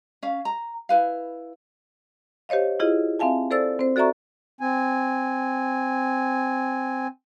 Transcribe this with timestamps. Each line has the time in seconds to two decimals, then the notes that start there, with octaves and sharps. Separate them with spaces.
0.22 C#4 F5
0.45 A#5
0.89 E4 B4 F5
2.49 G4 C5 C#5 D#5 F5
2.80 E4 F4 G#4 D#5
3.19 C4 E5 F5 G#5 A5
3.51 A4 C5 D5 E6 A6
3.79 C4 C5
3.96 F#4 A4 D5 E5 A#5 C#6
4.61 C4 G#5